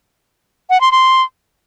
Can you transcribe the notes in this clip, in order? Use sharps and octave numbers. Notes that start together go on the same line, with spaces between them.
F#5
C6
C6